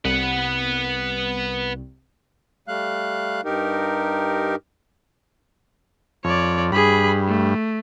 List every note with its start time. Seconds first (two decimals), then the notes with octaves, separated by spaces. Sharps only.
0.05 C2 B4 F#5
2.68 G3 A3 F5 F#6
3.45 G2 D#4 G4 A#4
6.25 F2 C#5 D5
6.72 G2 G#4 B5
7.28 A3